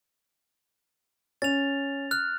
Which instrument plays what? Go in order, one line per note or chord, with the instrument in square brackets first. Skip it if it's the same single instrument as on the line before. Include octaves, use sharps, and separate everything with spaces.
[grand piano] C#4 [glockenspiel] A6 F7
[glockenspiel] F6 F#6